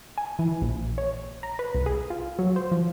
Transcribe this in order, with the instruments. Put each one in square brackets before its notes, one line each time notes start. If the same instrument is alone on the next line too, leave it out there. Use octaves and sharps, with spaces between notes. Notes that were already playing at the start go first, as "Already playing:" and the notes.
[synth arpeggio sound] G#5
E3
A#1
C#5
A#5
B4
C2
G#4
F4
F#3
C5
F3